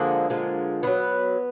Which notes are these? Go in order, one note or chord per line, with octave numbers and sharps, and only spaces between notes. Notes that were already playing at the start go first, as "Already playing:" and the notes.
Already playing: D3 F3 G#3 A#3
D3 F3 G#3
D3 F#3 B3